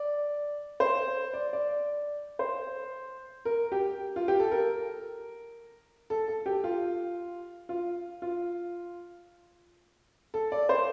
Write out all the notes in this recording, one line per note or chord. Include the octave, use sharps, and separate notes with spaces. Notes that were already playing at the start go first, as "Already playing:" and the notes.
Already playing: D5
C5
D5
D5
C5
A#4
G4
F4
G4
A4
A#4
A4
A4
G4
F4
F4
F4
A4
D5
C5